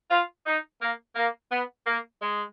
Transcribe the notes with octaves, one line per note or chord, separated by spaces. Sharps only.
F4
D#4
A#3
A#3
B3
A#3
G#3